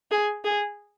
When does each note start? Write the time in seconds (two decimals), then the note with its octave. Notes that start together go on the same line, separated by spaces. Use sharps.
0.11 G#4
0.44 G#4